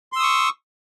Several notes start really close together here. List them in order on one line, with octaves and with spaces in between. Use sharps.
C6 E6 D#6 C#6